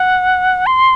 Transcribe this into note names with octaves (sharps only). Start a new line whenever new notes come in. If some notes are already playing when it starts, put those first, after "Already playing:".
Already playing: F#5
C6